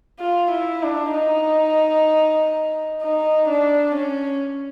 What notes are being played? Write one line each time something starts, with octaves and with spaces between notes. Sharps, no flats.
F4
E4
D4
D#4
D#4
D4
C#4